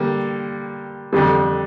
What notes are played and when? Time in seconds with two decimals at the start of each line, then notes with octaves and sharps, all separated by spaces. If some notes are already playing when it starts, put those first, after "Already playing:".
Already playing: D3 G3 A#3
1.13 F2 D3 G3